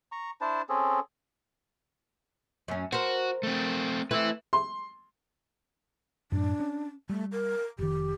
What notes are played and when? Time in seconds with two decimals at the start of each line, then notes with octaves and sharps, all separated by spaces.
0.12 A#5 C#6
0.41 D4 E4 C5 A5
0.69 C4 C#4 G#4 A4
2.68 F#2 C#4
2.92 F#4 A#4 C5
3.43 A3 C4
4.11 A3 C4 E4 B4 E5
4.53 C6
6.32 F#2 A2 D4
6.60 C#4
7.09 G3 A3
7.32 A#4
7.78 F1 D#3 G4